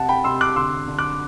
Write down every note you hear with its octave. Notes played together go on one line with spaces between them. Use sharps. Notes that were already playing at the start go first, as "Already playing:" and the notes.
Already playing: C3 F#5 A5
G5 B5
C3 C6 E6
D6 F#6
D3 C6 E6
D3
D6 F#6